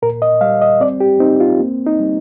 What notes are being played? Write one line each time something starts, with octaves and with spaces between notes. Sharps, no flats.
A#2 A#4
D#5
G3 F5
D#5
C4 D5
G4
C4 D#4
F4
A#3
D#4
G3